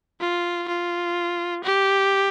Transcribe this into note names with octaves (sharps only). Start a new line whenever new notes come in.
F4
F4
G4